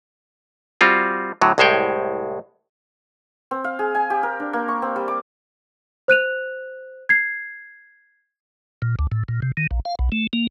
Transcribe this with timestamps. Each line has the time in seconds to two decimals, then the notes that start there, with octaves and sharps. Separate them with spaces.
0.81 G3 C4 F4 F#4
1.41 A2 D3 F#3
1.58 C2 A2 G#3 C5 C#5 G5
3.51 C4
3.64 F5
3.79 G#4
3.95 G#5
4.10 G4
4.23 A#4
4.40 D4
4.53 A#3
4.68 C#6
4.82 C4
4.96 G3
5.08 D6
6.08 C5 F#6 D#7 F7
7.09 G#6 C7
8.82 A#2
8.99 D2
9.12 A2
9.28 A#2
9.42 C3
9.57 D#3
9.71 A#1
9.85 F5
9.99 B1
10.12 A3
10.33 A#3